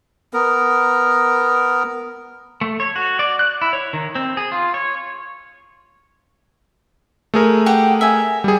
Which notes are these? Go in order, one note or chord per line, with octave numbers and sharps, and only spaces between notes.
B3 A#4
A3
C#5
F#4
D5
F#6
E4
C#5
D#3
C4
G#4
F4
C#5
A3 G#4 A#4
G4 F#5 G5
E5 G#5
G3 G#4